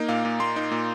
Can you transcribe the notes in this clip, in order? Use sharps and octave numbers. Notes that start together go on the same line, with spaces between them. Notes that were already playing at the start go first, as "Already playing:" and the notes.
Already playing: A#3 D#4
A#2 F5
A#2
A#3 C6
D#4
A#2